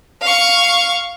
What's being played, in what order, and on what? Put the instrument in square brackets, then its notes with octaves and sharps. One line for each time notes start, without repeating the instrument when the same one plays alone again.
[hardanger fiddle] F5 C#6